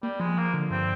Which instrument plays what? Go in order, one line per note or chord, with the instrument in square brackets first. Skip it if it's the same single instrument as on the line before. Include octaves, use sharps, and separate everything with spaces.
[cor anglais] G3 [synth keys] A#3
[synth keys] F3 [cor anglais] G#3
[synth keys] F3 [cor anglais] A#3
[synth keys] D3
[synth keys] G2 [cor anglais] C4